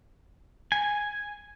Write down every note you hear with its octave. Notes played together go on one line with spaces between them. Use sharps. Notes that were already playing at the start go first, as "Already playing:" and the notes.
G#5